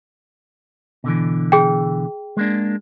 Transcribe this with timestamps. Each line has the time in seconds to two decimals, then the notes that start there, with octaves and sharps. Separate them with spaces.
1.04 B2 D3 E3
1.52 G#4 G5
2.37 G#3 A#3 D4